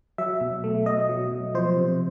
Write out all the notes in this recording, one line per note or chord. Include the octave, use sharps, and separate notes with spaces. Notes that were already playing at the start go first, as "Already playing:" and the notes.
F#3 E5
B2
A3
B2 D#5
F#3
B2
F3 C5
C3